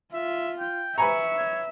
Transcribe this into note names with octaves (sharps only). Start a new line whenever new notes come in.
F4 E5
G5
B4 E5 G#5 A#5 C#6
C#5